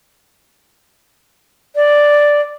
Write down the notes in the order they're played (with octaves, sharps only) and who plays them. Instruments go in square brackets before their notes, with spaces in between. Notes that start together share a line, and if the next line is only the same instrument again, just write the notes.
[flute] D5